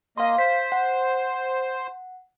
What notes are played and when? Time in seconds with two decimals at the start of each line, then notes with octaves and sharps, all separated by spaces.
0.18 A#3 D#5 F5 C6
0.39 C5 B6
0.72 F#5